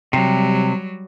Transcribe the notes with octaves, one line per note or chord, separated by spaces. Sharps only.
C3 F#3 G3